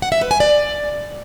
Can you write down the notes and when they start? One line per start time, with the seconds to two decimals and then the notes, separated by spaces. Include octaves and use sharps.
0.02 F#5
0.12 E5
0.21 B4
0.31 G#5
0.40 D5